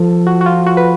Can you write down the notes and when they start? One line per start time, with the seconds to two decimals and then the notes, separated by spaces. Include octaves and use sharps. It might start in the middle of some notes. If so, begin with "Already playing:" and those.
Already playing: F3 A4
0.27 F#4
0.41 F#4
0.46 F4
0.66 F#4
0.77 B4